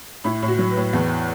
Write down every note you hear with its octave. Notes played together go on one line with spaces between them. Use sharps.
A2 E4
A2
F#4
F#3
B4
A2
E2